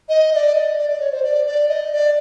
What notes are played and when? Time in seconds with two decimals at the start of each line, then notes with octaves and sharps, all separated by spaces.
0.09 D#5
0.33 D#5
0.36 D5
0.55 D#5
0.78 D5
0.89 D5
1.00 C#5
1.12 C5
1.23 D5
1.47 D5
1.69 D#5
1.92 D5